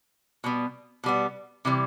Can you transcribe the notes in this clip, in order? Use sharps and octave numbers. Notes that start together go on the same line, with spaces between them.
B2 G3 B3
B2 G3 B3
C3 E3 G3